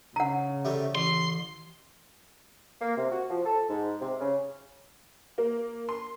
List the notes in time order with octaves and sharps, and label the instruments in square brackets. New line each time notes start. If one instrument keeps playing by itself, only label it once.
[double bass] C#3 [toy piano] F#5 A#5
[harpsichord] C3 G3 A3
[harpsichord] A1 [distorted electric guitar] C6
[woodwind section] A#3
C3
F#4
F3
A4
G#2
C3
C#3
[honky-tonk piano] A#3
C6